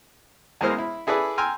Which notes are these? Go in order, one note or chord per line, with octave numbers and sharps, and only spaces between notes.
E2 E3 G#3 A#3 C5 F6
E4
E4 G#4 A4 B4 D5
G5 G#5 A#5 C6 E6 F6